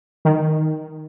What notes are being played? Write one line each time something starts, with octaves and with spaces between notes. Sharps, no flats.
D#3